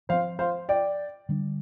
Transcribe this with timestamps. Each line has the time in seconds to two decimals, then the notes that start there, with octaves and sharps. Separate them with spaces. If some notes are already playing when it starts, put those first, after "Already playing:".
0.09 F3 C4 C5 F5
0.39 C5 F5
0.69 D5 G5
1.29 D3 G3 D4